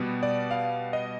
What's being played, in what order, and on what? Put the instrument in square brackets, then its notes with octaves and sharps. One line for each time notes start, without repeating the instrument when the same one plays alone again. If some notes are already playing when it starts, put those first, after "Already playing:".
Already playing: [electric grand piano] B2 G3 B3
D5
F5
D#5